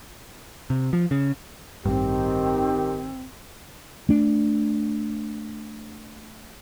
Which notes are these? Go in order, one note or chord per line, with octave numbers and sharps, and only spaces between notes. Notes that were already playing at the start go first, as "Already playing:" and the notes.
C3
F3
C#3
A1 G2 D#3 C4 G4
A3 D4